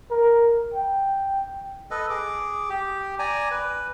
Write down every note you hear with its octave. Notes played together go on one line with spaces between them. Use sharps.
A#4
G5
A4 B4 D#5
G#4 D6
G4
D5 G#5 A#5
B4